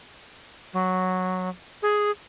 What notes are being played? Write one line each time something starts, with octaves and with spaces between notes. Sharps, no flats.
F#3
G#4